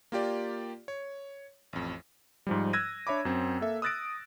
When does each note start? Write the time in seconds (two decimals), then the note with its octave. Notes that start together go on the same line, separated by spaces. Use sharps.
0.12 A#3 F4 G4 D5
0.88 C#5
1.73 A1 F2
2.47 G#2 F3 G3
2.73 E6 F#6 G#6 A#6 D#7
3.07 D4 C#5 E5 B5 D6
3.25 F#2 C4
3.61 A#3 A4 E5
3.82 D#6 E6 F#6 A6 A#6 D7